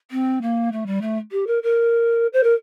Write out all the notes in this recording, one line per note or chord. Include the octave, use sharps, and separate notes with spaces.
C4
A#3
A3
G3
A3
G4
A#4
A#4
C5
A#4